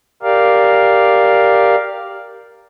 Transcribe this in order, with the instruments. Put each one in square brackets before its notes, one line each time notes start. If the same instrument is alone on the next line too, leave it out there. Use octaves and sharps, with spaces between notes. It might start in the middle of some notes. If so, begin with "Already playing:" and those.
[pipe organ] G4 A#4 D5 F5